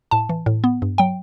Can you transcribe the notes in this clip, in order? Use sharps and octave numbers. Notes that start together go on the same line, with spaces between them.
A2 A5
E3
A2
B3
G2
F#3 G5